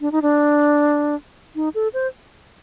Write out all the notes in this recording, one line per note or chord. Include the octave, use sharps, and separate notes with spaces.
D4
D#4
D4
D#4
A4
C5